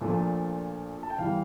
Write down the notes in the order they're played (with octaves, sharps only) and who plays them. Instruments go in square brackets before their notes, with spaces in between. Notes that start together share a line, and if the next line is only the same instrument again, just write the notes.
[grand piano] A#1 A#2 F3 A3
A5
G5
E2 E3 G3 F5